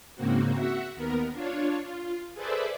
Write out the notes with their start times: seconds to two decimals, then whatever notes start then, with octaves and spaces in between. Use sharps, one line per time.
0.16 G#2 C#3 A#3 C4 F#4
0.53 F#4 E5 F#5
0.96 D#2 B3 A#4
1.32 D4 F4 C#5
1.84 F4
2.34 G#4 A4 B4 C5 D5 E5